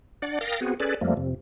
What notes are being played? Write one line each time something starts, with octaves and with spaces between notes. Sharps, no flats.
D4 D5 F#5
A#4 F5 G5 D#6 A6 A#6
B3 C4 F#4 G#4
C#4 G#4 A4 B4 D5
F2 F3 G3 A3 A#3
F2 C3